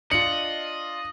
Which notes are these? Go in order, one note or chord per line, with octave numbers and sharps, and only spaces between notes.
D4 F4 D#5 C#7 F#7